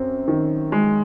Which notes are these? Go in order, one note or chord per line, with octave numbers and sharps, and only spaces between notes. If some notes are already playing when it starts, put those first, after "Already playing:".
Already playing: F#2 C4
D#3
G#3